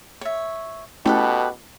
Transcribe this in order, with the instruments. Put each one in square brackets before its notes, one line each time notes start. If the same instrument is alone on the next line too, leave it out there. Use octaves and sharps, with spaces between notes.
[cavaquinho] C#5 E5
[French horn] B2 [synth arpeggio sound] A3 C#4 E4 [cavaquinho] G4 A4 B4